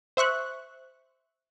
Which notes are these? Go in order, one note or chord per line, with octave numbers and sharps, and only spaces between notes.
C5 E5 C#6 F#6